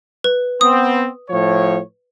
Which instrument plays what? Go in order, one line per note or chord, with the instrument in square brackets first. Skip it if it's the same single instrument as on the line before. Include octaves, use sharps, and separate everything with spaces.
[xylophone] B4
[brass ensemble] B3 C4 [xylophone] D#6
[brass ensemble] A2 F3 C#5